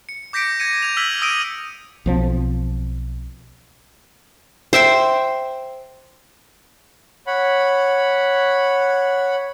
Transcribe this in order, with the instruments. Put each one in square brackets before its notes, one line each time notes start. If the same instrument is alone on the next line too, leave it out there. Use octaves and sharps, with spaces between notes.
[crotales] C#7
D6 G6 A#6 B6 C#7 D7
G#6 A#6 C#7 D#7
G#6 F7
E6 F6 B6 F#7
D#6 E6 G#6 A#6 D7 D#7
[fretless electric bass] B1 F3 G3 C4
[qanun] C5 E5 G5 C6
[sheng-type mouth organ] C#5 F#5 B5